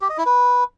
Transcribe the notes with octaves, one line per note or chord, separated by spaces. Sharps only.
G4
D#5
E4
B4